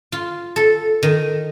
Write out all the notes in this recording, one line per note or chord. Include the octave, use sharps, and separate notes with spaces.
F4
A4
D#3